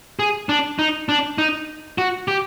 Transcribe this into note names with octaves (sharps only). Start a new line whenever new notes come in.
G#4
D4
D#4
D4
D#4
F#4
G4